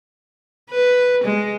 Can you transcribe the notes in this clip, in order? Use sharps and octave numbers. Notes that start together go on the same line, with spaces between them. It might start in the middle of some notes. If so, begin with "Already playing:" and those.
B4
G#3